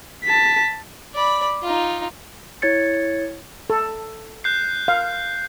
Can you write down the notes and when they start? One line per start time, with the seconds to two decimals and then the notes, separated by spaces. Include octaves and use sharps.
0.24 A5 B6
1.14 D5 B5
1.63 D#4 F4
2.62 E4 C#5 G#6 A6 C#7
3.70 A4
4.44 F#6 G6 C7
4.88 F5